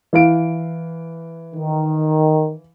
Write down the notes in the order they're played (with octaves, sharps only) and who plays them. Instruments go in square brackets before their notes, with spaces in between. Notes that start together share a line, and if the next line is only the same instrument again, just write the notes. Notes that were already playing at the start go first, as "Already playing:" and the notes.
[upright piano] E3 F5 D7
[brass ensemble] D#3